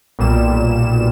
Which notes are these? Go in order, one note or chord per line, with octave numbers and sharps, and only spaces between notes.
B1 A#2 G3 E7